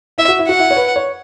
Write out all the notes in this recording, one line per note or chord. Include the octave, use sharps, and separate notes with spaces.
E4 E5
F#4
E4
F#4 F#5
E4
C#5
B4
C#5